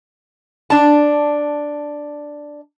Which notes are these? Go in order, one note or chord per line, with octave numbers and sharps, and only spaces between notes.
D4 A5